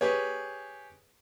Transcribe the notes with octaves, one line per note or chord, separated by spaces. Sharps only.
G4 G#4 B4 C#5